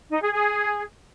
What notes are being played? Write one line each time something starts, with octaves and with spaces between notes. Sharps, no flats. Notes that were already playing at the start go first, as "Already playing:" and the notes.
D#4
G#4
G#4